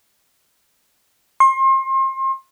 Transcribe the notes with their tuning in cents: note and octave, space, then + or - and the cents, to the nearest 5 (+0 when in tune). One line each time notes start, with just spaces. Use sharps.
C6 +35